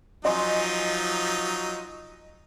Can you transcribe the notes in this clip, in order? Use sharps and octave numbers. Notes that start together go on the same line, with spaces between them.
F3 F#3 D#4 D#5 G#5 C6